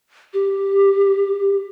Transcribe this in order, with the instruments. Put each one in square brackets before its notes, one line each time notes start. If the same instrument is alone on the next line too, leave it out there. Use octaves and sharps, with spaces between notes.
[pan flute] G4